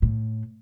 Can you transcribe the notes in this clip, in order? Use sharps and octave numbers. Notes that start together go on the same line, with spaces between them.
A2